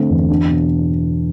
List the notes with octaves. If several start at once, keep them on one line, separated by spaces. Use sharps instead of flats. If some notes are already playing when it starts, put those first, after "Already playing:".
Already playing: D3 A3 C4
E2
D4
B2